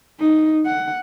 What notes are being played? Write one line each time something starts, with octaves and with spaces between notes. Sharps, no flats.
D#4
F#5